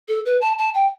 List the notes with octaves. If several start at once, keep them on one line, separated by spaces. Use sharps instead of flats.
A4
B4
A5
A5
G5